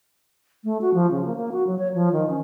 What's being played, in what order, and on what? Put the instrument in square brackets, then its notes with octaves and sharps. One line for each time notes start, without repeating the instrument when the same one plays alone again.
[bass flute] A3
F#4
F3
C#3
A#3
A#3
F#4
F#3
C#5
F3
D#3
C#4